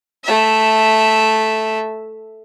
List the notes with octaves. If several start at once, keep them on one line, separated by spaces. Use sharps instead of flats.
A3 E5